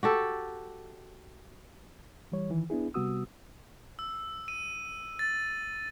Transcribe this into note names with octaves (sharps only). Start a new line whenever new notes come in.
F#4 G4 A4
E3 G3 C#5
D#3 E3
B3 D4 E4 G#4
C3 G3 B3 F#4 D#6 E6
E6
D#7
A6